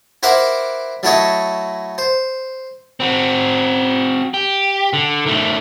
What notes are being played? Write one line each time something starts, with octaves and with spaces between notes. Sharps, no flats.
E4 A#4 C5 F#5 D6
F#3 A3 E4 A4 C#5 D#5
C5
C4 F#4
G4
D3
D#3 A3